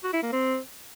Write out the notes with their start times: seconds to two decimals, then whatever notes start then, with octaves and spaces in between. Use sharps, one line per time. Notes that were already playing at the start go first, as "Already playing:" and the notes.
0.04 F#4
0.13 E4
0.23 A#3
0.33 C4